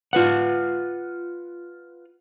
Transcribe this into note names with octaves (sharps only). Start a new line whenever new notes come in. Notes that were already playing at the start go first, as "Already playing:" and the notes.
F4 B4 F#5